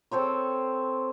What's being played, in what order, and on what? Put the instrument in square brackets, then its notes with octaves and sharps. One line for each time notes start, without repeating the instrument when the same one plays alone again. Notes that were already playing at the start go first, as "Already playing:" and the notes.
[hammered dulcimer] C4 A4 C5 C#5